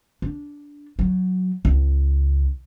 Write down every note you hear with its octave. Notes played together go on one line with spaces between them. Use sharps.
D4
F#3
C#2